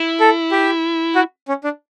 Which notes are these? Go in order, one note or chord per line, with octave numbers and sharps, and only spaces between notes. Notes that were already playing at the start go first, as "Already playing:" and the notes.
Already playing: E4
A4
G4
F#4
C#4
D4